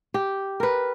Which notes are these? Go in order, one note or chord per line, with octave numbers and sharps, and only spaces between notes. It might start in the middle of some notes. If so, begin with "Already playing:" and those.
G4
A#4 B4